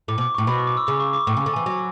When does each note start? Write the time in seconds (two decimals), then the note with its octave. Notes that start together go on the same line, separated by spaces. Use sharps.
0.08 A2 D6
0.18 B2
0.21 D6
0.35 A2 C#6
0.47 B2 B5
0.58 C#6
0.67 D6
0.77 E6
0.87 C#3 D6
1.00 C#6
1.13 D6
1.27 A2 C#6
1.37 C#3
1.46 D3
1.53 E3 G#5
1.66 F#3